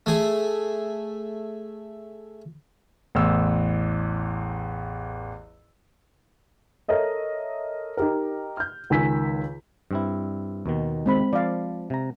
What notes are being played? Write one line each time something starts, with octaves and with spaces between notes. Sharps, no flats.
A3 G#4
A1 E2 E6
A4 A#4 C#5 D#5 E5
D#4 G4 A#4
F6 G6
C#2 D#3 G#5 E6 B6
G2 C4 E4
D#2 B2 D#3
G#3 C4 B5
F3 D5 F5
C3 A#5